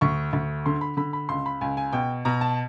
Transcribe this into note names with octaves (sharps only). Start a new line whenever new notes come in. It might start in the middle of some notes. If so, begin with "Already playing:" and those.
D2 C#6
D2
D3 C6
B5
D3 B5
B5
C#2 C6
B5
C#2 G#5
G#5
B2 G5
B2 A#5
A5